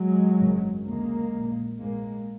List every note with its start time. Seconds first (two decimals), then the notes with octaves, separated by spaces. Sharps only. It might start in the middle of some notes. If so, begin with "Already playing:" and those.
Already playing: F#3 G#3
0.39 G#1 F#2 C#3
0.85 D2 C#3 G#3 A#3
1.33 A#1 A#2
1.80 A#1 G#2 G#3 A#3